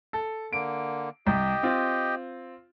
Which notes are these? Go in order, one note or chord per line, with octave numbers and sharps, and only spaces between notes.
A4
D3 A#3 D7
C2 G4 D#5 G5
C4 F4